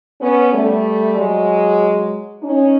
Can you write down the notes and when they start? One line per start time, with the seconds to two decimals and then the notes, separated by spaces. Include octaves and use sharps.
0.20 B3 C#4
0.52 G3 A3
1.16 F#3 G#3
2.42 C#4 D#4